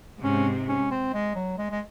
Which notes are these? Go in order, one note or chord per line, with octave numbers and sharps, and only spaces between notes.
G#2 C3 C#4
C#4
C4
G#3
F#3
G#3
G#3